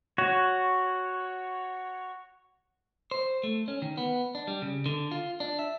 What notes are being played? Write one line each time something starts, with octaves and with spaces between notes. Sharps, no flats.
F#4 C#5
C5
A3
C#4
D#3
B3
D4
G3
C#3
D3
F4
D4
E5